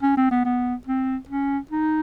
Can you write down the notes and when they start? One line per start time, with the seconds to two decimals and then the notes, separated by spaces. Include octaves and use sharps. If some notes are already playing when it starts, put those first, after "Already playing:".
0.02 C#4
0.17 C4
0.31 B3
0.45 B3
0.87 C4
1.29 C#4
1.71 D#4